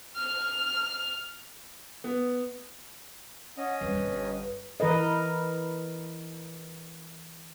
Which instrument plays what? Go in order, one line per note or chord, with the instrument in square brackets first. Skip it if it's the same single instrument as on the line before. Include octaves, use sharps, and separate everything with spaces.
[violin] F6
[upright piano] B3
[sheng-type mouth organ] C#4 D#5 [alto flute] F#5
[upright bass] F2 G3 [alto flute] B4
[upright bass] G1
[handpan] E3 A#4 B4 D#5